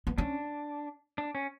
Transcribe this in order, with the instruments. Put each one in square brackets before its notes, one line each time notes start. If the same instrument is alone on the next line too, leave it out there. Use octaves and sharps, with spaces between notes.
[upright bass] B3
[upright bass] C#4 [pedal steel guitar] D4
[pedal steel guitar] D4
C#4